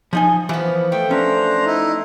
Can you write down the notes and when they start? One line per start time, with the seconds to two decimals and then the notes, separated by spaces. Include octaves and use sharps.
0.13 F3 D#4 G#5
0.49 E3 F3 B3
0.92 A3 G5
1.11 C#4 D4 C5 A#5
1.66 D#4 E4